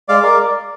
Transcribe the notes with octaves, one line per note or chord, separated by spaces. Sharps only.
G#3 D5 F5
A#4 D5